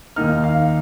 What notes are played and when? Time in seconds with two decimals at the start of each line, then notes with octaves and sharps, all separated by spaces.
0.16 D#2 D#3 A#3 D#4 F6
0.44 F5